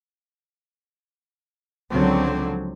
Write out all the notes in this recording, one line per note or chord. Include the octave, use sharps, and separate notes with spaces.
C#2 D3 F3 F#3 C4